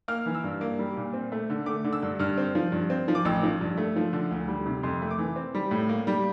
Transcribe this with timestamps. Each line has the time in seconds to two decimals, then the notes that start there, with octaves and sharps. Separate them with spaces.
0.08 A#3 F6
0.26 E3
0.35 E6
0.44 G2
0.61 A#3
0.79 G3
0.97 A#2
1.13 C4
1.32 A3
1.50 D3
1.66 A3 D6
1.84 D3
1.93 E6
2.03 G2
2.19 G2 F6
2.38 C4
2.55 F3
2.72 G2
2.90 C4
3.08 F3
3.15 D6
3.25 A1 E6
3.43 F3
3.61 G2
3.77 A3
3.96 F3
4.13 D3
4.31 D2
4.48 G3
4.66 C3
4.83 F2 C6
5.02 A3
5.11 D6
5.19 E3
5.36 C4
5.55 G3
5.71 A2
5.89 A#3
6.07 G3